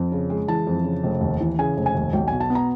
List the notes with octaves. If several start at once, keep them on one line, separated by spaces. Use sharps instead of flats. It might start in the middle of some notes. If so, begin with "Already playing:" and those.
Already playing: F2
C#3
G#3
E3 A5
F2
C#3
F1
D#2
E3
C#3 G#5
F1
G#5
D#2
B1 G5
B2 G#5
A5
B3
A#5